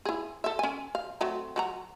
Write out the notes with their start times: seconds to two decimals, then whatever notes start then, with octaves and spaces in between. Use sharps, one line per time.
0.05 E4 G#4
0.44 A4 E5
0.59 C#4 G#5
0.95 F5
1.21 F#3 A3 C4
1.56 F#3 F#4 A#5